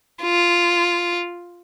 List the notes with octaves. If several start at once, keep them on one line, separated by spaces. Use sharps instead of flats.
F4